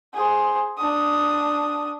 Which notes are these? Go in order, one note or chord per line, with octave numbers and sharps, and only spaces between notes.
G#4 C5
D4 D#6